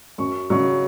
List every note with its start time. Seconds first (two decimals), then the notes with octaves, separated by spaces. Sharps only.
0.18 F#2 C#6
0.50 C#3 F#3 C#6